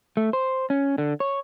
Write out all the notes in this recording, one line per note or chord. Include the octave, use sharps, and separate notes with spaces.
A3
C5
C#4
D3
C#5